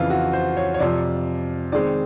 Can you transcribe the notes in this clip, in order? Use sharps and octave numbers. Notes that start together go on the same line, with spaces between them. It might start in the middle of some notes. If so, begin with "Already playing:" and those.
Already playing: F2 C#3 E3 F4
F#4
C5
C#5
C#5
F2 C3 F3 D5
D#3 G#3 C4 D5